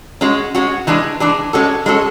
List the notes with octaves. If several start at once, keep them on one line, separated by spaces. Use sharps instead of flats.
G#3 C#4 F#4
G#3 C#4 F#4
E3 G#3 D4 G#4
E3 G#3 D4 G#4
G#3 C#4 F#4 A4
G#3 C#4 F#4 A4